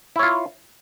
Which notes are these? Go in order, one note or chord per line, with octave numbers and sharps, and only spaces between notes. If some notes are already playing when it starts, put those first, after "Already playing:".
E4 F4 C#5